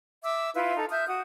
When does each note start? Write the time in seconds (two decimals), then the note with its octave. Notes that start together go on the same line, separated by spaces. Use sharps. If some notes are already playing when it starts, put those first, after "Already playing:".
0.23 E5 D6 E6
0.55 E4 F4 B4 E5
0.76 D#4 A4
0.91 E5 D#6 F6 G6
1.08 F#4 D#6